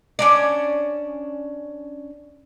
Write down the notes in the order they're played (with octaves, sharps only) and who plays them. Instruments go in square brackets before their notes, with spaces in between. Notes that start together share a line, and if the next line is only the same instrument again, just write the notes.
[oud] C#4 D4 D5